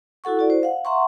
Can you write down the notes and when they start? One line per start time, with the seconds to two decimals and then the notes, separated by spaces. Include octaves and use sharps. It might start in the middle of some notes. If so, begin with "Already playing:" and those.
0.24 E4 F#4 A4 F#5 C#6
0.37 E4 F#4 D5
0.50 C5
0.63 F5 F#5
0.85 E5 F#5 A#5 C6 C#6